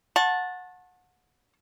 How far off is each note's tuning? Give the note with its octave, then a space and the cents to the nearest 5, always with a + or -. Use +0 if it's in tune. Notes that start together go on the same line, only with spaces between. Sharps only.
F#5 -25 A5 +0 C#6 -40